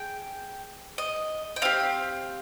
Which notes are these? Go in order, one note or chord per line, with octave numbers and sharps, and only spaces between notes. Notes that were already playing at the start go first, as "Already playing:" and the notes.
Already playing: G#4 G5
D#5
G5
C4 G4 F5